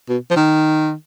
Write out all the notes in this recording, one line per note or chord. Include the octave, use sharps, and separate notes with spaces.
B2
F3
D#3